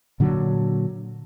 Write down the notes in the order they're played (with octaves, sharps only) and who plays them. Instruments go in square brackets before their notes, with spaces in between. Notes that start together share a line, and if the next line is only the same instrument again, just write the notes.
[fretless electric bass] A#2 D3 F#3